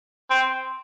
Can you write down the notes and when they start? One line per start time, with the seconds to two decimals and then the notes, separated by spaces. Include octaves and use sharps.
0.30 C4